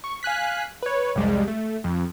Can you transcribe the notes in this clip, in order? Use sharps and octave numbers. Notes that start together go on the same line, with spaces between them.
C#6
F5 G#5 F#6 B6
B4 C#5
C2 F2 G3 G#3
A3
F2